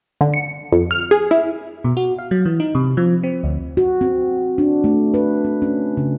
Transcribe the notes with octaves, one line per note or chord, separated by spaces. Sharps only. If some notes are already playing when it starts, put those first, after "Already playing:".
D3
C#7
F2
F6
G#4
E4
B2
F#4
F5
F#3
E3
D#4
C3
F3
C4
D2
F#4
C4
D4
A3
B4
C4
C#4
C#3